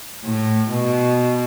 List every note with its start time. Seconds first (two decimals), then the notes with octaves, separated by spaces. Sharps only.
0.25 A2
0.72 B2